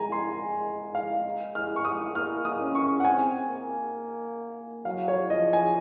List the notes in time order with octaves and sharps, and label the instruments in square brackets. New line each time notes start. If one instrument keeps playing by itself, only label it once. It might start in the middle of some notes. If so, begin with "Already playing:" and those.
Already playing: [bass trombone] G#3 [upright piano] G#5 A#5
[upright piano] C6
F5
F6
C#6
D#6
[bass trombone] A#3 [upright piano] F6
[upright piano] D#6
[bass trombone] C#4
[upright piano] C#6
F#5
[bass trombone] C4 [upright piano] G#5
[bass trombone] A#3
[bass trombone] F#3 [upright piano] F5
[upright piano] C#5
[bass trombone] F3 [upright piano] D#5
[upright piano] G#5